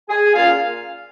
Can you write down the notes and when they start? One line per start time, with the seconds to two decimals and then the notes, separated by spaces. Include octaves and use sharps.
0.09 G#4 G#5
0.34 A#2 A#3 C#4 F4 F5